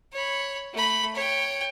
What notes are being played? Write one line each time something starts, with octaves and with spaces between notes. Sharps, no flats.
C#5 B5
A3 B5
C#5 G5